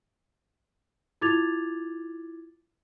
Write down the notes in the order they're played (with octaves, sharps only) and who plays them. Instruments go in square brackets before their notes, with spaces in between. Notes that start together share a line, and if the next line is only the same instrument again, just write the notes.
[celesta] E4 F4 D6 G#6 A6 F7